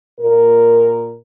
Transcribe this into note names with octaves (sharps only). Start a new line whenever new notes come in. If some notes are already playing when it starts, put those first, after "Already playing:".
A#2 A#4